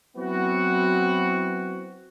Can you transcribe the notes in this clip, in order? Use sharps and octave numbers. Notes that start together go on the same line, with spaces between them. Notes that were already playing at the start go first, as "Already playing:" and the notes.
F#3 B3 C4 E4 F#4